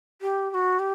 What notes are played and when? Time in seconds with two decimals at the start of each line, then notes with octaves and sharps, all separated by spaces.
0.21 G4
0.51 G4
0.54 F#4
0.79 G4